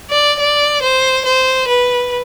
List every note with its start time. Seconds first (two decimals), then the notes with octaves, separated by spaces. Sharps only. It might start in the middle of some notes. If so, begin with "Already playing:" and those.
0.10 D5
0.40 D5
0.82 C5
1.25 C5
1.68 B4